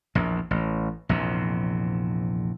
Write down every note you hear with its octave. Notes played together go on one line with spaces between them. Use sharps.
A#1 E2
A1
A#1 E2 C3